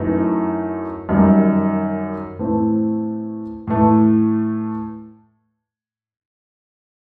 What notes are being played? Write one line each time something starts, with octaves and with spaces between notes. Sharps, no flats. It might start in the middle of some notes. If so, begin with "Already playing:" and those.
Already playing: F#2 E3 A3 D#4
F#2 D#3 G3 D#4
A2 E3 A3 C4
A2 E3 A3